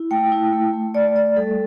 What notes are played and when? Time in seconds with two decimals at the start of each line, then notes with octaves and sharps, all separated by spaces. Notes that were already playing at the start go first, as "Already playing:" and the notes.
Already playing: E4
0.11 A3 G5
0.32 E4
0.53 A3
0.73 A3
0.94 A3 D5
1.16 A3 D5
1.36 G3 A4